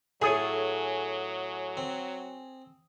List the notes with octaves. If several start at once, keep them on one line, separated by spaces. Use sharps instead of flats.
A2 F#3 G#4 A4 C#5 G#5 D#6 D#7
C4